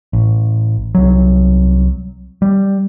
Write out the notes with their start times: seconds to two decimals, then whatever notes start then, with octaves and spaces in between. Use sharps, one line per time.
0.13 A1
0.95 C2 F#3
2.42 G3